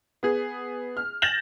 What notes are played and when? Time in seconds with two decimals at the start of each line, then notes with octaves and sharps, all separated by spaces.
0.23 B3 G#4
0.97 F6
1.22 G6 A6 A#6 E7 F#7